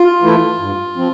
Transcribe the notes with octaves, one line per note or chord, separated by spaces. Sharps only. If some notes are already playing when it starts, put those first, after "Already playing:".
Already playing: F4
E3 A3 E4
G2
F3 C4